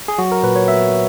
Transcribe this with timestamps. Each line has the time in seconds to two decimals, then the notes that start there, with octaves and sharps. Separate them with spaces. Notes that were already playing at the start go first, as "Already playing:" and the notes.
0.08 G#4
0.19 F#3 F#4
0.32 A#4
0.43 A#2 B4
0.56 C#5
0.68 B3 E5